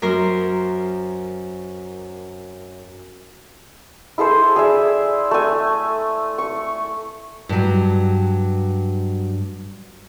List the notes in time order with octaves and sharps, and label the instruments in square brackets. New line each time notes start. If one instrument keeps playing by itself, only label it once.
[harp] F#2 A#4 C5 C6
[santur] E4 G#4 A4 C5
G#4 D5 E5
A3 G#5
C#6
[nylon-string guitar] G2 F#3